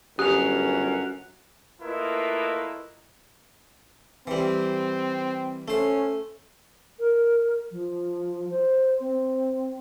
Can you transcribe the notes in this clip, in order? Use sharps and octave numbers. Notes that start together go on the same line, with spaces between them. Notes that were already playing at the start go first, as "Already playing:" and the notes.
G1 F#2 G4 F#6 F7
A3 A#3 E4 F4 B4 D#5
E3 G3 C4
A3 C#4 C5
A#4
F3
C5
C4